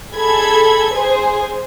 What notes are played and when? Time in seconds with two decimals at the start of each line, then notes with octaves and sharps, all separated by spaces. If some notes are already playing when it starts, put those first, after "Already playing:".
0.15 G#4 A4 B5 G#6
0.93 G#4 C5 G#5